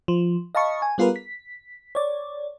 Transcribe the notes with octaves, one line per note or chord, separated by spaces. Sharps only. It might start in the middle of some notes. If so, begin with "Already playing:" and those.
F3
D#5 F5 A5 B5 C#6
G#5
G3 B3 F4 G#4 A#4 B4
B6
C#5 D5